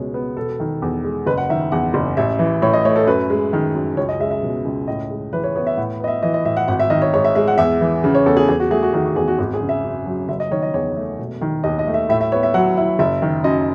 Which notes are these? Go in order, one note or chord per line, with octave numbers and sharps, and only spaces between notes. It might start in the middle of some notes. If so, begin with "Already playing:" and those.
Already playing: C#2 B2 G#3 C#5
B3
E1 A4
D#3
E2
G#3
F#1 B4
F#5
D#3 E5
E2 F#5
F#1
A1 E5
E3
A2 C#5
D#5
A3 C#5
A4
F#2 B4
G#3
D#3
F#2
C#2 C#5
D#5
G#3 E5
E5
B2
C#2
A2 D#5
G#3
E3 B4
C#5
B3 C#5
E5
A2 F#5
B3 D#5
E5
E3 D#5
D#5
A2 E5
F#5
G#1 F#5
E5
D#3 D#5
C#5
G#2 C#5
E5
G#3 E5
F#5
E2 E5
E3
C#3
C#5
E2 A4
G#4
E2 G#4
F#4
A3 G#4
F#4
D#3 G#4
F#4
E2 G#4
F#4
G#1 G#4
G#4
C#3
E5
F#2
F#3
F#1 E5
D#5
D#3 C#5
D#5
E2 C#5
A3
E1
D#3
D#2 D#5
D#5
A3
E5
A2 E5
E5
B3 C#5
E5
F#3 F#5
E4
F#1 E5
D#3
F#2 D#5